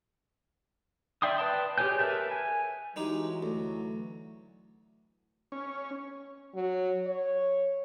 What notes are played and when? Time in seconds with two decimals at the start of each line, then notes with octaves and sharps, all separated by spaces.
1.22 D5 E5 G5 C6 D#6
1.38 B4 D5 G5 A5 C6
1.78 G4 G#4 C#5 G#5 G6
1.99 A#4 B4 E5 A5
2.31 G#5
2.96 E3 F#3 G#3 D#4 G4
3.43 D2
5.52 C#4
6.55 F#3
7.07 C#5